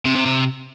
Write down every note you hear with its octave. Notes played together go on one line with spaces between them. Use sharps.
C3
C3
C3